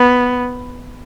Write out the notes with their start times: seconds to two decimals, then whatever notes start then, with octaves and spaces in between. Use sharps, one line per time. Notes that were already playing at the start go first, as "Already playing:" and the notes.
Already playing: B3